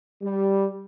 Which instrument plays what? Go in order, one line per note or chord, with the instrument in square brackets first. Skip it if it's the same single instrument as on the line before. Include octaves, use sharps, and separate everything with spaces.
[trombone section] G3